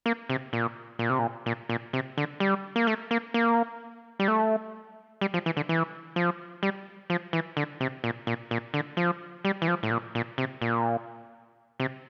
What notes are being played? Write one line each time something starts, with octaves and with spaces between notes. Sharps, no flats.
A#3
C3
A#2
A#2
C3
A#2
A#2
A#2
C3
D3
G3
A#3
A3
A#3
A#3
G3
A3
G3
F3
E3
D3
E3
F3
G3
F3
E3
D3
C3
A#2
A#2
A#2
D3
F3
G3
E3
F3
A2
A#2
A#2
C3
A#2
C3